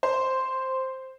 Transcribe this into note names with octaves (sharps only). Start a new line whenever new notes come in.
C5